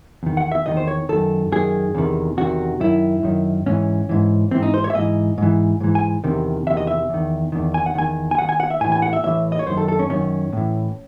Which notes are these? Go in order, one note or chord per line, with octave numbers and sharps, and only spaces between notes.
E2 D#3
F#5
E5
E2 D#3 D#5
C5
C#5
F#2 D#3 A4
F#2 D#3 G#4
E2 C3 D#3
E2 C3 D#3 F#4
F#2 D#3 E4
F#2 D#3
G#2 E3 C#4
G#2 E3
G#2 E3 C4
D#4
C5
C#5
E5
G#2 E3 D#5
G#2 E3
G#2 E3
G#5
E2 C3 D#3
E2 C3 D#3 E5
D#5
E5
E2 D#3
E2 D#3
G#5
F#5
E2 D#3 G#5
G#5
E2 D#3 F#5
G#5
F#5
E5
A2 E3 G#5
G#5
F#5
E5
A2 E3 E5
D#5
C#5
F#2 D#3 C5
A4
A4
C#4
F#2 D#3 C#4
A2 E3